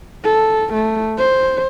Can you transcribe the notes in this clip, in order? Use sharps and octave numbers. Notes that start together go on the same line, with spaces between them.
A4
A3
C5